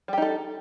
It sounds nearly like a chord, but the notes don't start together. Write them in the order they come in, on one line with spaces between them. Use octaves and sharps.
G3 G4 D#4 A4